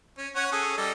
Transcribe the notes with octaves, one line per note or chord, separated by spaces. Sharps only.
C#4
C#4 C#5 F#5
C#4 G#4 A4
G3 A4 D#5